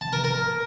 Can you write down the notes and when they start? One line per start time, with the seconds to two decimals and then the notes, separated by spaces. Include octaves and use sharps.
0.01 A5
0.13 A#4
0.24 A#4